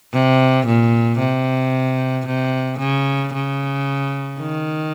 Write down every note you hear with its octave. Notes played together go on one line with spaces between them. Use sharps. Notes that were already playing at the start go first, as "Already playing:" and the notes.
C3
A#2
C3
C3
C#3
C#3
D#3